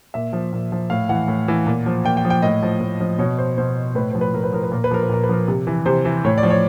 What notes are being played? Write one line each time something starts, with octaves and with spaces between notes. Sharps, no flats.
A#2 E5
F3
A#2
F3
A2 F5
E3 F#5
A2
E3
A#2
F3
A#2 G5
G5
F3
G5
A2 D#5
F3
A2
F3
B2 C#5
C5
B2 C5
A2 B4
F3 C5
B4
A2 A#4
B4
F3 A#4
B4
A#2 A#4
B4
F3 A#4
B4
A#2 A#4
B4
F3 A#4
C3
E3
C3 C5
E3
A2 C#5
D5
F3
C#5